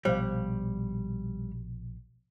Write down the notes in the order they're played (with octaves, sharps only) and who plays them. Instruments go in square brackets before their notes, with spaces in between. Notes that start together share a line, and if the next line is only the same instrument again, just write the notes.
[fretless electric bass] A#1 B2 F3 [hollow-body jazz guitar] G3 [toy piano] C5 F5